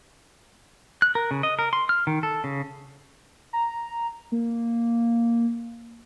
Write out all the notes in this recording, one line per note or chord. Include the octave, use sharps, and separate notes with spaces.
F#6
A#4
C#3
D#5
A#4
C6
F6
D#3
A4
C#3
A#5
A#3